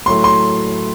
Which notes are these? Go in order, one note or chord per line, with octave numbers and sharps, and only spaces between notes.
A2 F#3 A3 C6
C6